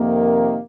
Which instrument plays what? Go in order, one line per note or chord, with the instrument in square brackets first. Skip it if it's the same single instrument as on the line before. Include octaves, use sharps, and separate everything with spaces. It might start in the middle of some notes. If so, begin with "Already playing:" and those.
Already playing: [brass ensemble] F2 C3 D#3 A#3